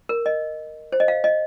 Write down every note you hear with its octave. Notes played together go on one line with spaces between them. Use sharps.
A#4
D#5
C5
D#5
F5
D#5